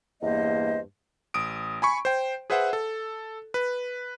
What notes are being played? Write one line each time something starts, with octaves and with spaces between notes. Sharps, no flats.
E2 G2 A#3 C5 D#5
A1 D#6 D7
G#5 B5 C#6
C5 G5
G#4 B4 C5 E5 F#5
A4
B4